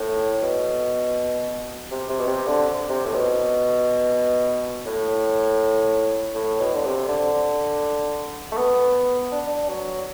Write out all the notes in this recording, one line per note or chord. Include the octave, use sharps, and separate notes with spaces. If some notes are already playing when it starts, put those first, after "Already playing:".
Already playing: A2
B2
C3
C3
B2
C3
D3
C3
A2
B2
A2
A2
B2
D3
C3
D3
A3
B3
D4
D4
F#3